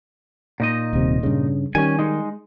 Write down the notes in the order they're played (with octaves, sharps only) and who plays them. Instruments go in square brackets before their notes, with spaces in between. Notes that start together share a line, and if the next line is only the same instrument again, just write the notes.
[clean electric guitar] A#2 D#4 D#5
[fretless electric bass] D#1 C3
G2 C#3
[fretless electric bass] D#3 G3 [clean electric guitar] C#4 G#5
[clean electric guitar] G#3 D#4